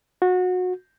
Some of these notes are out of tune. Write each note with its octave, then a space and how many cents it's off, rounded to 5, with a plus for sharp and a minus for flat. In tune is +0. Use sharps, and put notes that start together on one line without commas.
F#4 -25